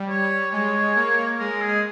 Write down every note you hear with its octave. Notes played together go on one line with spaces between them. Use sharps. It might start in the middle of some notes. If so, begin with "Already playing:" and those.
Already playing: G3
C#5
G#3 C#5
A#3
G#3 A#4
G#4